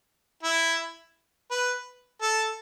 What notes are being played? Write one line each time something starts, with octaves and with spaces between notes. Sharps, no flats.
E4
B4
A4